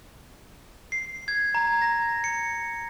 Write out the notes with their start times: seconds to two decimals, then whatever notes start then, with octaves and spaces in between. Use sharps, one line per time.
0.92 C7
1.28 G#6
1.55 A#5
1.82 A#6
2.24 C#7